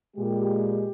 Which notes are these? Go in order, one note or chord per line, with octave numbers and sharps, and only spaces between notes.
A#2 G#3 G4